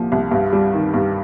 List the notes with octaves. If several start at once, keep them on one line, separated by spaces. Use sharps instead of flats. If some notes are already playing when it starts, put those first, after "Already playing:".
Already playing: C2 A#2 F3
C2
G2
G3
D#3
G2